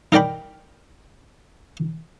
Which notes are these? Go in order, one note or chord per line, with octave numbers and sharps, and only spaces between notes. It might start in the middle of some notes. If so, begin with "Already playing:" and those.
D#4 A#4 D5 G5 B5